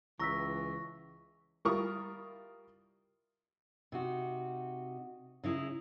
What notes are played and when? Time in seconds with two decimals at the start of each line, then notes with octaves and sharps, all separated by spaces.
0.20 C#2 E3 A#5 C#6 E6 A#6 B6
1.65 G3 E4 F4 A#4 C#6 D#6
3.92 C3 D#4 F#4
5.44 C#3 D#4 E4 G#4